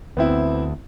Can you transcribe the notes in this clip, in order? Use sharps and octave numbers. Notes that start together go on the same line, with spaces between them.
D2 B3 C4 E4